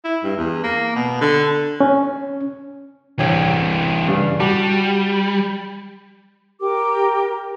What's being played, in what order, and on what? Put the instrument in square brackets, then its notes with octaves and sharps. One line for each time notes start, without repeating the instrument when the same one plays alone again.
[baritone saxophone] E4
G2
E2
A#3
B2
D3
[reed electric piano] C#4
[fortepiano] C2 C#5 G5 [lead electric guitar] E3 D4
[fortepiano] G2 C#3 D4
[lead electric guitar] G3 [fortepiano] F#4 A5 D6
[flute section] G4 A#4 D6